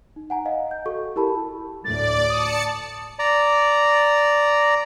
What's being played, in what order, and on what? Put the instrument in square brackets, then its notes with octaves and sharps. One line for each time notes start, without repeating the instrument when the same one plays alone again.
[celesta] D#4
F#5 G#5 A#5
D#5 F5 F#5 G#5
G6
F#4 A4 C#6
E4 G4 A#4 A5 B5
[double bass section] D2 A2 [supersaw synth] D5 [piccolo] A6
[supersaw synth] A5 C#7 [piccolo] D#6
[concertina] D5 A#5